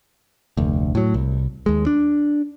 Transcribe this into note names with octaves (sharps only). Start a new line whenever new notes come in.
F1 D2
A2 F#3
C2
D#2 G#3
D4